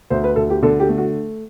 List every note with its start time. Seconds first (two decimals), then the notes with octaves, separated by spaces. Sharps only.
0.10 D2 C5
0.24 B4
0.36 D2 A4
0.50 G4
0.62 D3 A4
0.80 G4
0.89 A3
0.98 F#4